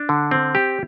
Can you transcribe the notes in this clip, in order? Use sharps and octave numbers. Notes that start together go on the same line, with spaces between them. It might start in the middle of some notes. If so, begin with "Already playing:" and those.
Already playing: D4
D3
C4
G4